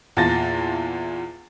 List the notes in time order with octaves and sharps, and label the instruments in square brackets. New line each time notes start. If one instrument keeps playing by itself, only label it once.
[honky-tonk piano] E2 A#2 F4 A5 A6 A#6